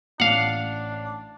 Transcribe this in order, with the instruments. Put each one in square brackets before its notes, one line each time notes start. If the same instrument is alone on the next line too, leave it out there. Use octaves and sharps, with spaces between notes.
[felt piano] A1 [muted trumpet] D4 [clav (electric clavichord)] F5 F#5